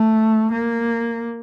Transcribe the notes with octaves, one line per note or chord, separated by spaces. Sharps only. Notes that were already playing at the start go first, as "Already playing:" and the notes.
Already playing: A3
A#3